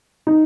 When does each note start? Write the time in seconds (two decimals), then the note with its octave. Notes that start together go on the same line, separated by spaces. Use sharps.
0.27 D#4